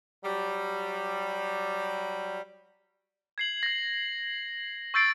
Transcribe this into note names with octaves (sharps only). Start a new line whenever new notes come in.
F#3 G3
G#6 C7 F#7
G#6 A#6
C#6 E6 G6 A6 C7 D7